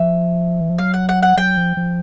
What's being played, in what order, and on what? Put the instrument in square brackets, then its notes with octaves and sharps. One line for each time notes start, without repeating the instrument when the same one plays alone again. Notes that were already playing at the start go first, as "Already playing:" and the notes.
Already playing: [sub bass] F3 [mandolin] E5
[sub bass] E3
F3
[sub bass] F#3 [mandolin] F5
[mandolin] F#5
F#5
F#5
[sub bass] F#3 [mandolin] G5
[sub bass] F3
F3